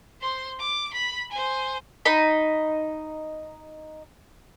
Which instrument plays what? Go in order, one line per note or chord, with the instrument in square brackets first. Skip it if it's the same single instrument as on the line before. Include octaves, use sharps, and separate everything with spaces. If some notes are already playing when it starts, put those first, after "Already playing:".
[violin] C5 C6
D6
B5
C5 G#5
[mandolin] D#4 D#5 B5